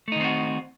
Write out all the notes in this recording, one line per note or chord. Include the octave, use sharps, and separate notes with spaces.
D#3 A3 C4 D#4 F#4